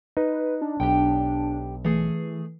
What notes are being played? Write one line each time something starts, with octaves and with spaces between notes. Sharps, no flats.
D#4 B4
D4
B1 G4 G5
E3 A3 G#4